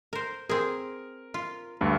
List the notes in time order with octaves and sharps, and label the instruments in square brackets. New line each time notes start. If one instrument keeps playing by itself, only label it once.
[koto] A#4 C5
[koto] C4 G#4 [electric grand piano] A#4
[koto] F4
[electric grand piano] D2 G2